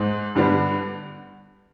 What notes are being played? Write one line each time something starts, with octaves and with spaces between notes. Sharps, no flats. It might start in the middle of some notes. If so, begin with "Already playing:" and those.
Already playing: G#2 G#3
G2 D3 G3 B3 D4